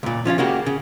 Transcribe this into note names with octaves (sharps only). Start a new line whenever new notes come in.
C#2 A#2
F3 C#4 D#4 F4
C#3 A#3 F#4 G4
C#3